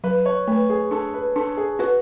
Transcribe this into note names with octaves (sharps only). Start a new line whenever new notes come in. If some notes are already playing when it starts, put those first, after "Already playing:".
F#3 B4
C#5
A3 B4
G#4
D4 A4
B4
D4 A4
G#4
F#4 B4